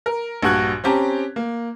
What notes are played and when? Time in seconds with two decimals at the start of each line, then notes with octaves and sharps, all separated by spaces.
0.06 A#4
0.43 A#1 G2 F#4 C#6 F#6 G#6
0.84 C4 C#4 G4 A5 A#5
1.36 A#3